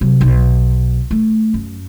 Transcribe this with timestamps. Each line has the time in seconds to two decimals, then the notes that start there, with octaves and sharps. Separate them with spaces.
0.01 C3 F#3
0.21 B1
1.11 A3
1.54 F#2